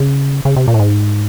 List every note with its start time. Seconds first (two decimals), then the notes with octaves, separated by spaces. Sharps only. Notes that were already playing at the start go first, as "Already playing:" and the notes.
Already playing: C#3
0.45 C#3
0.56 C3
0.68 A#2
0.74 A2
0.79 G#2